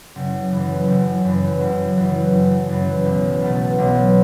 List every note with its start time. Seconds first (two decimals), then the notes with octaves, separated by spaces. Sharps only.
0.15 F#1
0.52 F#2 E3
0.88 F#1
1.25 F#2 E3
1.61 F#1
1.97 F#2 E3
2.33 F#1
2.69 F#2 E3
3.05 B1
3.42 B2 A3
3.78 B1